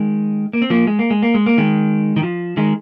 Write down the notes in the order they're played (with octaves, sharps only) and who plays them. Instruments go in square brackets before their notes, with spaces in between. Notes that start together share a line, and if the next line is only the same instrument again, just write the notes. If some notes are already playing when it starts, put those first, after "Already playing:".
Already playing: [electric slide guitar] D#3 G#3
A#3
C4
F3 A#3
G#3
A#3
G#3
A#3
G#3
A#3
D#3 G#3
D#3
F3
D#3 G#3